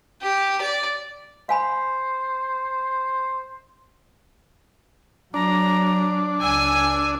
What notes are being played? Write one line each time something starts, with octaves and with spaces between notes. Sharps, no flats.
G4
D5
C5 F5 G#5 B5
F#3 D4 A#5
C#2 G#5 E6